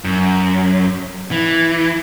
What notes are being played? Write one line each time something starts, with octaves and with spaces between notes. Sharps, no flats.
F#2
E3